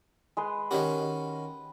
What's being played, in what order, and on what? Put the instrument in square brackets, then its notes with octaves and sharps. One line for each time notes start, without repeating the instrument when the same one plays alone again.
[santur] G#3 B4 C6
[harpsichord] D#3 C#4 F#4 [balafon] G4 D#5 [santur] G5